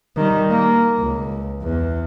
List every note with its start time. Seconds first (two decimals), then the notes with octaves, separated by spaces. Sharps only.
0.16 D#3 G3
0.50 A#3
0.99 C#2
1.62 E2